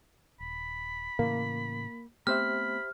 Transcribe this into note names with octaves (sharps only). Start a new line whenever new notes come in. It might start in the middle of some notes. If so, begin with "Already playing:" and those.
D#1 B5
A2 C#3 E3 A#3
A3 B3 C4 G4 C5 E5 B5 F6